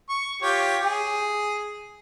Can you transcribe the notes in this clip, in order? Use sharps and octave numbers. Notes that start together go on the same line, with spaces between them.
C#6
F4 G4 C#5
G#4